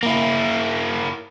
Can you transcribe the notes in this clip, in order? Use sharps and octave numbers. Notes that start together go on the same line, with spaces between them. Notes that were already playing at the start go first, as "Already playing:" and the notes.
A#3 E4